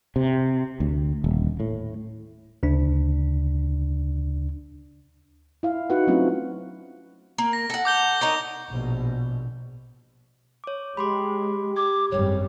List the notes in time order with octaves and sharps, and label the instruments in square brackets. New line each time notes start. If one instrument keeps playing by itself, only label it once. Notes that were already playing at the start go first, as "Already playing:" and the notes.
[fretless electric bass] C3
D2
D#1
A2
[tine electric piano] D2 C#3 D4
[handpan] E4 F5
D#4 F#4 B4 F#5
F#3 A3 C4 C#4 E4 F4
[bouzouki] A#3
[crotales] A#6
[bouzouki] A4 F#5
[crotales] D6 G6 G7
[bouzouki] D#4 A#4 C#5
[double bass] A#1 B2
[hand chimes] C#5 D6
[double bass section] G#3 [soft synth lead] G4 [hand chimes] B5 C6 D6
[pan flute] D6 [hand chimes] G#6
[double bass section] G#1 F#2 G3 [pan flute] C#5